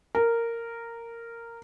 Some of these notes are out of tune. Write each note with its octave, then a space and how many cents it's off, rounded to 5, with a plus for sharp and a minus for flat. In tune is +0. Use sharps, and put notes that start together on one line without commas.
A#4 -10